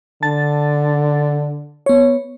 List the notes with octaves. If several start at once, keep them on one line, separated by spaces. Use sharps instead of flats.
D3 A5 A6
B3 C#5